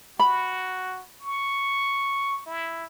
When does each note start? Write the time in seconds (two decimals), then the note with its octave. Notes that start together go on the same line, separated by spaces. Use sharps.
0.19 F#4 B5
1.21 C#6
2.46 E4